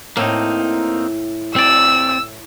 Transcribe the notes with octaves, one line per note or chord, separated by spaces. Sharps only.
A2 A#3 C4 D#4
C4 D5 E6